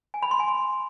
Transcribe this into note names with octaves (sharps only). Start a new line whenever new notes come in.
G#5
B5
C6
G#5
C6